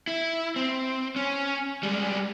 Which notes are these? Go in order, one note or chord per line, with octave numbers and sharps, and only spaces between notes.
E4
C4
C#4
G3 G#3